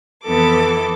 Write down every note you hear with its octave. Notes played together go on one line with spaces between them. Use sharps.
F2 E3 B3 A4 D6